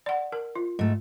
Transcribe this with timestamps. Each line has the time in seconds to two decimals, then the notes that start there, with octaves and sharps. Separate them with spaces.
0.06 D5 F#5
0.32 A#4
0.56 F4
0.79 G#2 A3